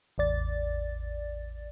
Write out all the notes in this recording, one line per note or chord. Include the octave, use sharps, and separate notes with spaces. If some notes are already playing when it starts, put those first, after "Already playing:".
A1 E2 D5 A6